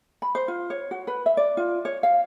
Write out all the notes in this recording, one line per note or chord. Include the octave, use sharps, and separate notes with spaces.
B5
C5
F4
C#5
F#4
B4
E5
D5
F4
C#5
F5